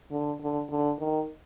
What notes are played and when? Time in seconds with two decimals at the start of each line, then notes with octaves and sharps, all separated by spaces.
0.11 D3
0.40 D3
0.69 D3
0.99 D#3